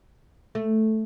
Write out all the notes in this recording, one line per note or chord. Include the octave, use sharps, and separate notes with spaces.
A3